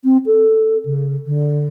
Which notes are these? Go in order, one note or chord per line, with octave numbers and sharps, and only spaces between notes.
C4
A4
C#3
D3